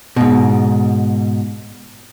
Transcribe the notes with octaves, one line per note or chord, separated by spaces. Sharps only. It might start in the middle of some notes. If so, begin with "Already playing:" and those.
G#2 B2